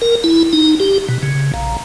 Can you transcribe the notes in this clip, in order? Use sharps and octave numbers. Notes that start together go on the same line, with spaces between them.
A#4
E4
D#4
G4
B2
C#3
A#1